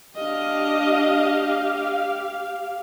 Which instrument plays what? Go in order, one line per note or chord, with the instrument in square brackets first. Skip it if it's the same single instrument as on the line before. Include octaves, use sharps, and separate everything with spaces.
[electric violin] D4 D#5 [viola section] G4 F5